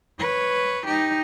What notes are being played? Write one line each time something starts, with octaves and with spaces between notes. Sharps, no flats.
B4 C#5
D#4 G4